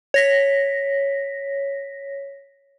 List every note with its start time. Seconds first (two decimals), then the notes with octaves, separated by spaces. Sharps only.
0.14 C#5 A#6 B6